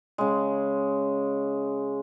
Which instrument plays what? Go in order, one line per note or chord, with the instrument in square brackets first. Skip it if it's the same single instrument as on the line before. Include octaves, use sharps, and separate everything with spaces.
[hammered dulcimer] C#3 G#3